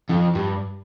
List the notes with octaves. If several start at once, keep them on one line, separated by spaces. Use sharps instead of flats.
F2
G2